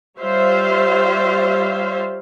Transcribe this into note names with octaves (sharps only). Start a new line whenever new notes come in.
G3 F4 C5 C#5 E5 F5